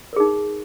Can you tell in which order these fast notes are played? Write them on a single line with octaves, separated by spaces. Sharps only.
A#4 G#4 D#4